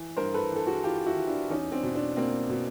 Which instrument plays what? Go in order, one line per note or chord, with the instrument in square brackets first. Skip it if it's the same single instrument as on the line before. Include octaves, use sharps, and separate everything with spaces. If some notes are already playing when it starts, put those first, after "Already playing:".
Already playing: [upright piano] E3
G2 A#4 C5
A4 B4
E3 A4
F#4 G#4
E3 F4 G4
E4 F#4
E3
D4 E4
E2 C#4 D#4
C4 D4
B2
C4 D4
B2 A#3 C4
B2